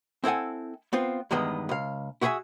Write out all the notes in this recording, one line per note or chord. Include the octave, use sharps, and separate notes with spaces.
C4 E4 A4 F#5 G#5
B3 C4 F4
E2 G2 D#3 G#3 B3
C#2 F5
E4 F#4 G#4 A#4 E5 G#5